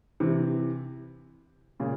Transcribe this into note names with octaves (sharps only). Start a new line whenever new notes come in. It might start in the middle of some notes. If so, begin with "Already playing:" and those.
C3 E3
A#2 C#3